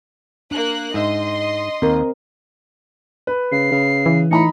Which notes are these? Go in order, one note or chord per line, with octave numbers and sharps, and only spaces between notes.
A#3 D4 F#6
G#2 D#5 E5 C6
D#2 C4 A#4
B4
C#3 C7
C#3
E3
A2 D#4 A#5 B5 C#7